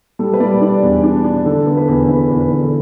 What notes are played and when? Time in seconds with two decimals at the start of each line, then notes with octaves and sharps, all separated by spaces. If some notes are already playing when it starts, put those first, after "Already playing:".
0.19 G3 A4
0.33 B4
0.40 G3 D5
0.61 D4 D5
0.83 E2
1.04 D4
1.24 D4
1.45 D3 A4
1.66 B3 A4
1.77 B4
1.88 E2
2.09 D3 B4
2.30 E2
2.40 B4
2.51 D3
2.65 A4